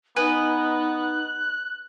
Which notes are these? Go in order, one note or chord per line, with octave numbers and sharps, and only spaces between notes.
B3 D#4 B4 D#5 G#5 F#6